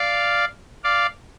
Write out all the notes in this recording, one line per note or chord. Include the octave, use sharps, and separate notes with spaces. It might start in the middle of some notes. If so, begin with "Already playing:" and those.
Already playing: D5 F5
D5 F5